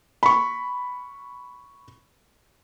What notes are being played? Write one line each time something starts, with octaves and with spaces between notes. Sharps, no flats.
B5 C#6